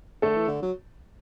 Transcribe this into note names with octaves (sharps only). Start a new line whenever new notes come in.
D3 A3 A4
E3
D3
F#3